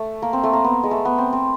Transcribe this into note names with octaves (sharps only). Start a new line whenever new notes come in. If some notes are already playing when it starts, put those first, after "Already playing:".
Already playing: A3
A#3
C4
A3
A#3
B3
G#3
A3
B3
C4
C4